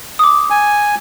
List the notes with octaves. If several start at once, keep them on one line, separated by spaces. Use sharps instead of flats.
D6 D#6
G#5